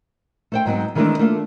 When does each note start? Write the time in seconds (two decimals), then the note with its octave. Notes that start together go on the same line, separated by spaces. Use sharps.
0.52 A3 C5 G5
0.65 G#2 F#3 B3 C4
0.95 D#3 E3 G#3 A3 C4 D4
1.19 A3 A#3 D4 F4